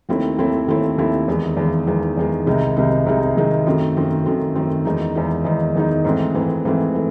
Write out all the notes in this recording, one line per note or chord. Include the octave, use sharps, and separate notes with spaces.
D#2 D#3 A3 C4 E4
D#2 D#3 A3 C4 E4
D#2 D#3 A3 C4 E4
D#2 D#3 A3 C4 E4
E2 D#3 G#3
E2 D#3 G#3
E2 D#3 G#3
E2 D#3 G#3
C2 C3 D#3 G#3 D#4
C2 C3 D#3 G#3 D#4
C2 C3 D#3 G#3 D#4
C2 C3 D#3 G#3 D#4
F#2 D#3 A3 C4
F#2 D#3 A3 C4
F#2 D#3 A3 C4
F#2 D#3 A3 C4
E2 D#3 G#3 D#4
E2 D#3 G#3 D#4
E2 D#3 G#3 D#4
E2 D#3 G#3 D#4
G#2 E3 A3 C4
G#2 E3 A3 C4
G#2 E3 A3 C4
E3 A3